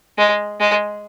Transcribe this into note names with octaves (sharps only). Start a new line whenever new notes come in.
G#3
G#3